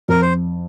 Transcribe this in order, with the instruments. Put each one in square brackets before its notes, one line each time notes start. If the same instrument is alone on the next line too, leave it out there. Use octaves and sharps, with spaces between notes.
[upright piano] F2 [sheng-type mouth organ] A#4
[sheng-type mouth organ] C5